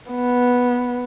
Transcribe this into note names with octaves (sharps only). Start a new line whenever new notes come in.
B3